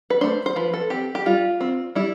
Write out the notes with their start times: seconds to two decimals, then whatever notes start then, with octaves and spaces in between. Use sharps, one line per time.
0.10 B4
0.21 A3 D4 C5
0.46 C5
0.56 F3 B4
0.74 A4
0.90 C4 G4
1.15 G4
1.26 G3 F4
1.61 C4
1.95 G3 E4